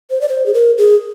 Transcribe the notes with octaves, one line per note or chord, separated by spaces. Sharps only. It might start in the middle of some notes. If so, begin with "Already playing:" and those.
C5
D5
C5
G#4
A#4
G#4